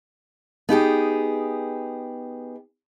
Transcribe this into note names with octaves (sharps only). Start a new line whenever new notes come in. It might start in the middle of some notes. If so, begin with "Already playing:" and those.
B3 D#4 G4 G#4